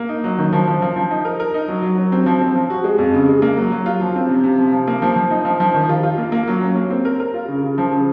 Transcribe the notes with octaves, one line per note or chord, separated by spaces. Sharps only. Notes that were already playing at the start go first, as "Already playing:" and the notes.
Already playing: A#3
D#4
F#3
D#3
F3
F3
F3
F3
D#4
A#4
A#4
D#4
F#3
F#3
F#3
C4
F3
C4
F3
F#4
G#3
F2
C#3
G#3
A#3
F#3
F#3
F4
F3
C4
C3
C3
F3
F3
A#3
F3
F3
D#4
F3
F3
D#3
F4
F4
A#3
A#3
F#3
C#4
A#3
C4
A#4
A#4
F4
C#3
C#3
F3
C#3